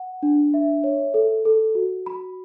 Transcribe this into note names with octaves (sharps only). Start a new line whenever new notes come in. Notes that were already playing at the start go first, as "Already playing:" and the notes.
Already playing: F#5
D4
E5
C#5
A4
A4
F#4
B5